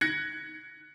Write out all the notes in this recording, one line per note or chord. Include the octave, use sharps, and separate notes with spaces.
F#6 G#6 A#6 C#7